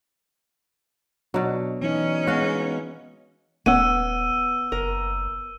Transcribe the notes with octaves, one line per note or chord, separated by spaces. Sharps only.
B2 F#3 D4
E3 C#4 D#4 D#5
G#3 B3 F#4 F5
D#1 B3 C#4 F#5 E6 D#7
F#1 A#4